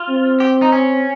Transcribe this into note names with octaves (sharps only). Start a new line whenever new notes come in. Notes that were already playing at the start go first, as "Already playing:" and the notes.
Already playing: F4
C4
G4
D#4
C#4